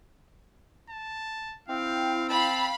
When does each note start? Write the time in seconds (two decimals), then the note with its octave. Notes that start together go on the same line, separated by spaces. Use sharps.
0.90 A5
1.68 C4 E4 F5 G5
2.30 F5 A5 B5